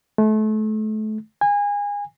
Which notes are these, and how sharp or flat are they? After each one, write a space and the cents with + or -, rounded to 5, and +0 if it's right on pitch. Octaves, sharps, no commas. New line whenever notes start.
A3 -30
G#5 -25